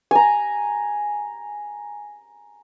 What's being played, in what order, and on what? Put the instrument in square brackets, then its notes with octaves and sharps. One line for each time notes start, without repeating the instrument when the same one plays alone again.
[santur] G#5 A#5